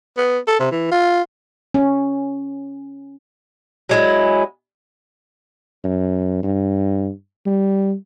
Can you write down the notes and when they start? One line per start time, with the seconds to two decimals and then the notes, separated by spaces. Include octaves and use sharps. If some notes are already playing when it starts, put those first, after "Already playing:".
0.17 B3
0.47 A4
0.60 C3
0.72 E3
0.91 F4
1.74 C#4
3.89 F#3 G#3 E4
5.84 F#2
6.43 G2
7.46 G3